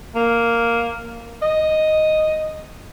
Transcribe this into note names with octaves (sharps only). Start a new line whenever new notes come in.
A#3
D#5